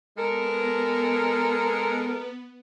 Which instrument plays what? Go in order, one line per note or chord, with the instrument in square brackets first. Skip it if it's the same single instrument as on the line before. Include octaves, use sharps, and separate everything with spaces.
[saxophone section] G#3 A4 A#4 [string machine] B3